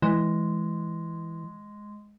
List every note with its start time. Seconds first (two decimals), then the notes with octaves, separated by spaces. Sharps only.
0.02 E3 G#3